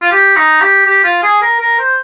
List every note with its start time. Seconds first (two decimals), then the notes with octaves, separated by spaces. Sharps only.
0.02 F4
0.11 G4
0.36 D#4
0.61 G4
0.86 G4
1.04 F4
1.23 G#4
1.42 A#4
1.60 A#4
1.79 C5